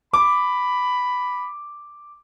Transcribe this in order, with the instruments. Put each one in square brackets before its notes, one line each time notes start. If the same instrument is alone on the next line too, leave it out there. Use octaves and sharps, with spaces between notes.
[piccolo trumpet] B5 [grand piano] D6